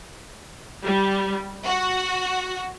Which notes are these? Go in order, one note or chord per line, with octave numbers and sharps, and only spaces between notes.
G3
F#4